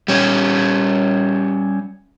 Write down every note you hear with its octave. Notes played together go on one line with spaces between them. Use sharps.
G3 C#4